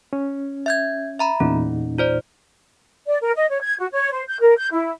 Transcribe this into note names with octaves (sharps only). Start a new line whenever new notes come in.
C#4
E5 G6 G#6
E5 A#5 B5
E2 A#2 C#4 D#4
F4 C5 D5
D5
A#4
D#5
C#5
G#6
F#4
C#5
C5
G6
A#4
G6
E4